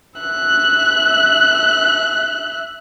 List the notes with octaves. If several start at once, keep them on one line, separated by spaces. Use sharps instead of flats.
E5 F#6